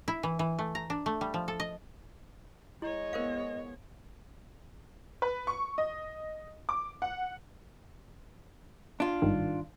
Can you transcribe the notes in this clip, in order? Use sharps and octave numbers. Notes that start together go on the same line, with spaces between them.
E4
E3
E3
A3
A#5
D4
A3
G3
F3
A4
D#5
G#3 E4 C#5 D#5
B3 A#4 C5 F5
B4
C#6
D#5
D6
F#5
D4 F4
G#1 G2 D#3